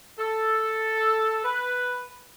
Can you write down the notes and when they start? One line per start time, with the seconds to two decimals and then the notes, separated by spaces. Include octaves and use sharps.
0.19 A4
1.44 B4